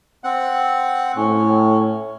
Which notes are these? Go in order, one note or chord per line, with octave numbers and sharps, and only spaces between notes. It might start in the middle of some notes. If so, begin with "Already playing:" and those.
C4 F#5
A2 C#4